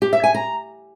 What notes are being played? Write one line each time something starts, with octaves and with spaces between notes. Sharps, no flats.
G4
E5
G#5
A#5